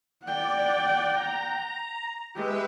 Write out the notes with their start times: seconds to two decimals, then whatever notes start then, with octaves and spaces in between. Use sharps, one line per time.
0.24 D5 F#5 G5
1.12 A#5
2.36 G#3 G4 B4 E5